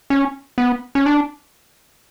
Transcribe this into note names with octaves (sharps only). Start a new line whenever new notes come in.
C#4
B3
C#4
D4